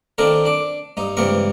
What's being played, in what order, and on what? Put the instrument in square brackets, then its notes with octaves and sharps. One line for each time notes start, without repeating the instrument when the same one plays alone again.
[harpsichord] D#3 C4 D4 F4 A4 A#4
D4 D6
G2 D#4
C#2 G2 E3 C4 A#4 C#6